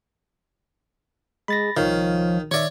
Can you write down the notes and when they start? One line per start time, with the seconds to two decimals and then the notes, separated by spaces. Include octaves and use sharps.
1.48 G#3 B5 A6 A#6
1.77 C2 D#3 F3 C#5 F5
2.51 D#3 C#5 D5 E5